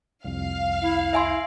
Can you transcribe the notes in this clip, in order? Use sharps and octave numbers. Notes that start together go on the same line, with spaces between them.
C2 F2 F5
E4
E5 G#5 C6